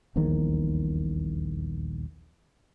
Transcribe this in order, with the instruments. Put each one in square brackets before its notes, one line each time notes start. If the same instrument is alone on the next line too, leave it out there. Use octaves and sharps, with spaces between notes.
[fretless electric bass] D#1 A#1 E2 D#3